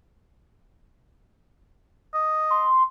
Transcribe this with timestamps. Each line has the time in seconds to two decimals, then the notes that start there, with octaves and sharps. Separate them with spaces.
2.14 D#5
2.50 C6